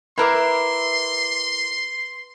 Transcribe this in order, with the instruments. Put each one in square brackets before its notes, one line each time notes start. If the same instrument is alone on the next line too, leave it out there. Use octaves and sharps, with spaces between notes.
[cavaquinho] E4 A#4 E5 [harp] B4 D6 [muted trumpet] C6